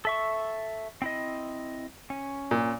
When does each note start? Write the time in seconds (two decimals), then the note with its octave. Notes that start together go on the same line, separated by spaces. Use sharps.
0.05 A4 E5 C#6
1.02 C4 E4 D#5
2.10 C#4
2.51 A#2